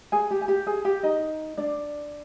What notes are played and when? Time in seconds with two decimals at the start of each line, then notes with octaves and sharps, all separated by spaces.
0.12 G#4 G#5
0.31 G4 G5
0.41 G#5
0.48 G4 G5
0.67 G#4 G#5
0.85 G4 G5
1.03 D#4 D#5
1.57 D4 D5